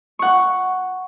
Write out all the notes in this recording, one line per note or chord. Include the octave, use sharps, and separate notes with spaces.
F#5 C#6